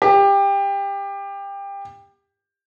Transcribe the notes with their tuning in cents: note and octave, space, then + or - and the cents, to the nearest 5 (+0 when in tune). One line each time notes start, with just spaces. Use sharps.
G4 +20